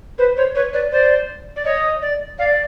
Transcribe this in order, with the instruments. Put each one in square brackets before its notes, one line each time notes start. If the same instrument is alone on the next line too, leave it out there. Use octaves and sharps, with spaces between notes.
[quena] B4 [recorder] C5
[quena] C5 [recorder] C#5
[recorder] B4 [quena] C#5
[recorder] B4 [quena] D5
[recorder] C5 [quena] D5
[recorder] D5
[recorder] C#5 [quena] D#5
[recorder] D5
[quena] D5 [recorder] F5